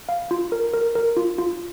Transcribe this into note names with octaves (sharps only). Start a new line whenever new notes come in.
F5
F4
A#4
A#4
A#4
F4
F4